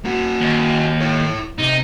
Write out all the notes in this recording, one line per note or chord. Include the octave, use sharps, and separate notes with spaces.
A#3 F#4
D#2
E4 C#5
C3 D#4